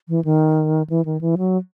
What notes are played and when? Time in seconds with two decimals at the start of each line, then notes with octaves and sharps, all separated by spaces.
0.09 E3
0.25 D#3
0.90 E3
1.05 D#3
1.21 E3
1.38 F#3